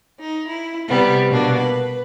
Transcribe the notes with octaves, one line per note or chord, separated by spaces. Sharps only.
D#4
E4
C3 G3 B3
B2 A#3 D4
B4